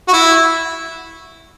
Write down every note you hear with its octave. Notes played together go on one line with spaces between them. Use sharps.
F#4
E4